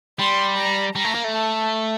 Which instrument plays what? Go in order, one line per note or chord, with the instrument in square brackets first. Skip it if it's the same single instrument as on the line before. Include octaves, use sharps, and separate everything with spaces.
[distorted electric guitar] G3 [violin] C6
[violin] A#5
[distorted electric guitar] G3 [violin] A#5
[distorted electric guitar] A3
A#3
A3
[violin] A5